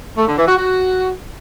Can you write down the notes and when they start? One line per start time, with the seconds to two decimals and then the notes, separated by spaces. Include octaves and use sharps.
0.18 A3
0.28 D3
0.38 E3
0.48 F#4
0.58 F#4